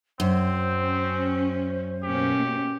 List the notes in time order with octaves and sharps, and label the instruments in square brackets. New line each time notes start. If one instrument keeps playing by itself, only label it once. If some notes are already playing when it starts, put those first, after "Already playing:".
[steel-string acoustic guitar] F#2 [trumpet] C4 [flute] C5
[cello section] C#4
[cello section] B2 A#3 C#4 [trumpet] G4